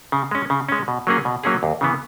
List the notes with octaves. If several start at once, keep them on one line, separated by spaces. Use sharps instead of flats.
C#3
G#3 C#4
C#3
G#3 C#4
B2
F#3 A#3 C#4 G#4
B2
F#3 A#3 C#4 G#4
D#2
C#3 E3 B3